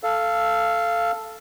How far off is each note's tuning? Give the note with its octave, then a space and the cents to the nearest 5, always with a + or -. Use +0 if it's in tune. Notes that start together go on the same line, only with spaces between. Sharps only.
A4 +0 F5 -15